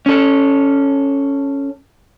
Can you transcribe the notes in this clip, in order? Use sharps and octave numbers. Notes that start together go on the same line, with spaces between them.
C#4 A4